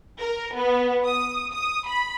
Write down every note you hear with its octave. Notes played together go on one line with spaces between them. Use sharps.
A#4
B3
D#6
D#6
B5